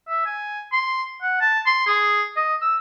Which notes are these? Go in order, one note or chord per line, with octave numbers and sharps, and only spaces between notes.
E5
G#5
C6
F#5
A5
C6
G#4
D#5
E6